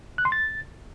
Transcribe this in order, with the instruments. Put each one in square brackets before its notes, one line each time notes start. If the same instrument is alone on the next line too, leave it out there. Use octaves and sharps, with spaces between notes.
[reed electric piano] F#6
C6
A6